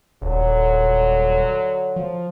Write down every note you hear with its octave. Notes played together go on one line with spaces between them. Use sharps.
D#1 D3 F#3
F3